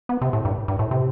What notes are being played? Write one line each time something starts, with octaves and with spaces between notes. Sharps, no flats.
B3
C3
A2
G2
G2
A2
C3